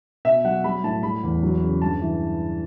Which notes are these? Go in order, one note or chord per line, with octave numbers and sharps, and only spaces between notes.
B2 E5
F#3 F#5
G3 B5
A2 A5
G3 B5
E2
F#3
C#3
G2 A5
E3